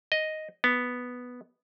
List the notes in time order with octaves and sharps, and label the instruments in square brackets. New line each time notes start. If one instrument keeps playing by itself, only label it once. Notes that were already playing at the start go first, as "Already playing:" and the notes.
[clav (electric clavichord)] D#5
B3